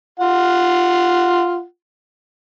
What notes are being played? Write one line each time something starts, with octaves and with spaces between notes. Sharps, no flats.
F4 F#5